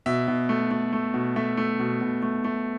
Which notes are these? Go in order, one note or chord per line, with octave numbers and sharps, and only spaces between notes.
B2 E5
B2
A3
A3
A3
B2
A3 E5
A3
B2
B2
A3
A3